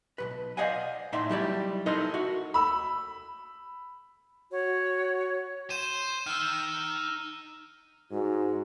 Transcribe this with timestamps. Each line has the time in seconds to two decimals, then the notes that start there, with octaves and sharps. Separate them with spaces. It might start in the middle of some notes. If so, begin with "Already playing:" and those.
0.18 B1 B2 B4
0.57 C5 D5 D#5 F5 F#5 G#5
1.13 A2 D#4 D5 E5 C6
1.29 F#3 G3 E4 D5
1.86 D#4 E4 A4 A#4 C5 D#5
2.14 F#4
2.54 B5 E6
4.51 F#4 C#5
5.70 C5 D#7 E7
6.26 D#4 G5 E6 F6
8.11 G#2 F#4